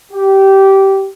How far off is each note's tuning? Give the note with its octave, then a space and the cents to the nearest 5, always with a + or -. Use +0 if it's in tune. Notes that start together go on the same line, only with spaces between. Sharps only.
G4 -15